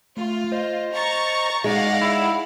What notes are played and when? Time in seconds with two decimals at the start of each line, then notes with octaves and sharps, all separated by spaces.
0.17 A3 F4
0.52 C5 D#5
0.92 A#5 C#6 A6
1.64 G#3 D#4 D5 F5 F#5 A#6
2.02 E4